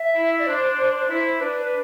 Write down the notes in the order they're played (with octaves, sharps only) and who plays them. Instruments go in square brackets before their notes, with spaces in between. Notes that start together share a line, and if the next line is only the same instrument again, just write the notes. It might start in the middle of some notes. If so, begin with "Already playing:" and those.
Already playing: [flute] E5
[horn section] E4
[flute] D5
[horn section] D4 [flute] C5
[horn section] D4
[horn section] E4 [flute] C5
[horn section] D4 [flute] B4